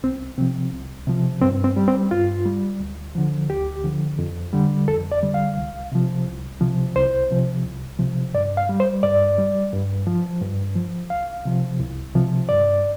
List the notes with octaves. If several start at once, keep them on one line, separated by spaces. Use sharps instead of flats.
C2 C4
C3 F3 C4
C2
C3 F3
G2 C4
C4
G3
C4
G2 F4
G3
D2
D3 F3
D2 G4
D3 F3
F2
D3 G3
F2 A4
D5
D3 G3
F5
C2
C3 F3
C2
C3 F3
C2 C5
C3 F3
C2
C3 F3
G2 D5
F5
G3
C5
G2 D5
G3
G2
F3
G2
F3
C2 F5
C3 F3
C2
C3 F3
G2 D5